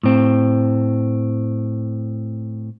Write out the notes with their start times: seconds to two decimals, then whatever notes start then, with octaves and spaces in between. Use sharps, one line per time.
0.03 A2 C4